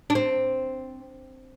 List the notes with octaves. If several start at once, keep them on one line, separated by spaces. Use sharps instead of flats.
D4
C4